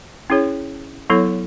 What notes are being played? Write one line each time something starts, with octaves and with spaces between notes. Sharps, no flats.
C#4 E4 G#4 C#5
F#3 B3 E4 A4 C#5